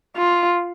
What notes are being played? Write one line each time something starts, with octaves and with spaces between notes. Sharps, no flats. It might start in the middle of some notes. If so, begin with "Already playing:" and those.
F4